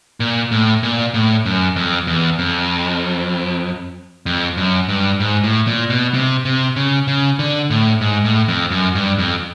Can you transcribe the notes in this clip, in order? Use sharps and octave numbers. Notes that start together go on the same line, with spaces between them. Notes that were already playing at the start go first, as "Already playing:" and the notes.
A#2
A2
A#2
A2
F#2
F2
E2
F2
F2
F#2
G2
G#2
A2
A#2
B2
C3
C3
C#3
C#3
D3
A2
G#2
A2
F2
F#2
G2
F2